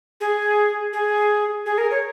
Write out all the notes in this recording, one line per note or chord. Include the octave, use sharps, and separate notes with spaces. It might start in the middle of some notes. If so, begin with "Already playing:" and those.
G#4
G#4
G#4
A#4
C#5